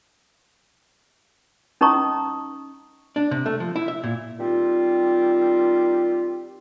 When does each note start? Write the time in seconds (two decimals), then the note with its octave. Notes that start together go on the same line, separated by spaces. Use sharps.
1.81 C#4 D#4 D#5 A#5 C#6 D#6
3.16 D4
3.31 C3
3.46 A3
3.60 F3
3.76 E4
3.88 E5
4.04 A#2
4.39 D#3 G3 C4 F4